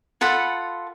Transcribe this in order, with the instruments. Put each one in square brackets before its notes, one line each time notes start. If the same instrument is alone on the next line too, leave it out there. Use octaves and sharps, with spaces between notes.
[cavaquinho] F4 A4 F#5 B5